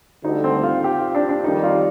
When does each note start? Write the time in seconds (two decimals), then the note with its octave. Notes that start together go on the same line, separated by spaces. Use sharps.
0.24 D2 D3 G3 D#4
0.44 C4
0.63 F4
0.84 G4
0.99 F4
1.15 D4
1.29 D4
1.44 F2 D#3 G3 D#4
1.63 F4